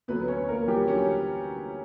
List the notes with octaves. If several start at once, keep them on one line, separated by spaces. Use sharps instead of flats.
D2 D3 F#3 B3 B4
C#4 C#5
A#3 A#4
G3 G4
D3 F#3 C#4 C#5